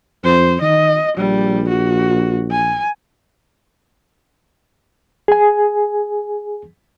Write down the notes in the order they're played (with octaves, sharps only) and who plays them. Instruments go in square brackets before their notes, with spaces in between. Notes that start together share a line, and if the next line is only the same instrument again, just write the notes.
[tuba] F2 [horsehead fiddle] C5
[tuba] D#3 [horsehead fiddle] D#5
[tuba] A#1 [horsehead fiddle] G3
[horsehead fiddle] F#4
G#5
[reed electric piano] G#4 G#5